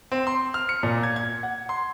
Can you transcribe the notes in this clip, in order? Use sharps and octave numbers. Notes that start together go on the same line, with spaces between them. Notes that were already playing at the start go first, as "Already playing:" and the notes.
C4
C6
F6
C#7
A#2
G#6
G#6
F#5
C6